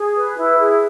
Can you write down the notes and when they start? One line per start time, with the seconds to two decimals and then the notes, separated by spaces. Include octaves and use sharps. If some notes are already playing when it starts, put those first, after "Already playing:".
Already playing: G#4
0.15 B4
0.37 E4
0.58 G#4